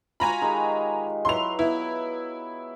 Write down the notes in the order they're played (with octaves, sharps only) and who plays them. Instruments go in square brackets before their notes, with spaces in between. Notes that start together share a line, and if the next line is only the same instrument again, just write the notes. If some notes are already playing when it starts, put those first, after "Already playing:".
[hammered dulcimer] F4 F#4 [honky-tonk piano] G#5 A#5 B5
[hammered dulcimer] D#3 G#3 G4
[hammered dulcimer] F#3 E4 B4 [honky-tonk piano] C6 F7
[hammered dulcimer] B3 [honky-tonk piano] E4